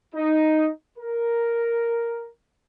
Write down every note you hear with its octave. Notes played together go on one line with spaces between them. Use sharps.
D#4
A#4